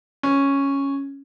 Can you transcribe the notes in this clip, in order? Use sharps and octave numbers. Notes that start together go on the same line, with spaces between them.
C#4